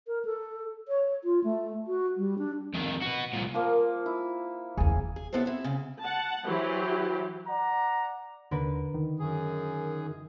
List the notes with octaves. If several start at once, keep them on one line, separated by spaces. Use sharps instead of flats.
A#4
A4
C#5
F4
A3
F#4
G3
D4
F2 D#3
F#4 B4
C2 A#2
F3 A#3
E4
F#1 E2 G#4
G#4
F#2 C3 B3 E4 A4 C5
C4 E4
D2 C#3
F#5 A5
E3 F#3 E4 G4 C5
D5 F#5 A#5
D#2 D3 A#4 B4
D#3
F#2 G#4